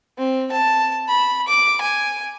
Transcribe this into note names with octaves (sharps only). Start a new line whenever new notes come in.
C4
A5
B5
D6
G#5